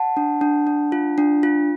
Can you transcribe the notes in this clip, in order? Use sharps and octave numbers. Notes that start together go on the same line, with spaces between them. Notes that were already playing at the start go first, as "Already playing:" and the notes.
Already playing: F#5 A5
D4
D4
D4
F4
D4
F4